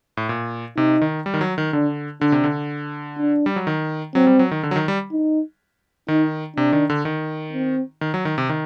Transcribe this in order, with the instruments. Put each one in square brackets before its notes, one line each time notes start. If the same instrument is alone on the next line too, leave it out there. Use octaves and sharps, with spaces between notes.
[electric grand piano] A2
A#2
[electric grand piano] C3 [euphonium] D#4
[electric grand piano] D#3
G3
D#3
F#3
D#3
[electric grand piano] D3 [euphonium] D4
[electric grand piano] D3 [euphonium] D4
[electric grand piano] C3
D3
[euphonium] D4
[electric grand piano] G3
F#3
D#3
[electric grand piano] F#3 [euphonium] C4
[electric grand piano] G3
F#3
D#3
D3
F#3
D#3
G3
[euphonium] D#4
[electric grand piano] D#3 [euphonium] D#4
[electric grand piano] C3 [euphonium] D4
[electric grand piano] D#3
D3
D#3
[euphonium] C4
[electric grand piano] D#3
F#3
D#3
C3
D#3